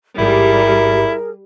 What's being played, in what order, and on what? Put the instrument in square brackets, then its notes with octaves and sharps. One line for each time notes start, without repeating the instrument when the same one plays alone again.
[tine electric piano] A1 G#2 [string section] G3 [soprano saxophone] E4 [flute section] G#4 A#4